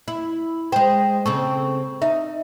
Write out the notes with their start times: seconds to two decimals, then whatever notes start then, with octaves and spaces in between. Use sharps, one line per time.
0.08 E4
0.72 G#3 C5 G5
1.26 C#3 C4 A4 C#6
2.02 D#4 E5